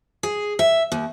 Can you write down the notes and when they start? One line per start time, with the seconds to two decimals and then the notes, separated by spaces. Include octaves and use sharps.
0.23 G#4
0.59 E5
0.92 D#2